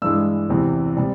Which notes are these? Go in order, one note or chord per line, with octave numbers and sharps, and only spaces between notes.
G2 E3 G#3 E6
E2 C3 E3
C3 G3